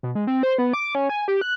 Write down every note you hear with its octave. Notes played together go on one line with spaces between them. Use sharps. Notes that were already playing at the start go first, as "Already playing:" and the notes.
B2
G#3
C4
C5
B3
D6
C#4
G#5
G4
F#6